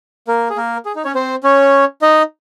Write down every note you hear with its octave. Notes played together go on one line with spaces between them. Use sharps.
A#3 A#4
G#4
A#3 A#4
G#4
D#4
C#4 C#5
C4 C5
C#4 C#5
D#4 D#5